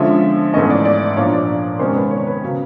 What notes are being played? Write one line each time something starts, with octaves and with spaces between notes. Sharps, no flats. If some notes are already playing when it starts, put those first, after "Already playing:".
Already playing: D3 F3 G#3 C#4 E5
G#2 E3 A3 C#4 D#5
D5
D5
A#2 F3 A#3 D4 C#5
D5
C3 D#3 G#3 C#4 C5
B4
C#5
B4
C#3 F#3